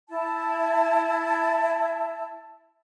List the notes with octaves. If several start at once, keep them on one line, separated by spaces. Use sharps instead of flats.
E4 A5